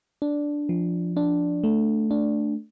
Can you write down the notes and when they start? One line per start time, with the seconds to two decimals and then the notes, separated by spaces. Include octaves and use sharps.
0.22 D4
0.69 F3
1.17 D4
1.64 A3
2.11 D4